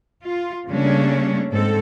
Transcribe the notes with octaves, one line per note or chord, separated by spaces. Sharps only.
F4
C#3 G3 A3 A#3 C#4 D4
G#2 C4 A4